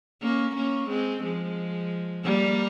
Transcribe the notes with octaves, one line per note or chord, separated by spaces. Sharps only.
A#3 C#4
A#3 C#4
G#3 C4
F3 G#3
G3 A#3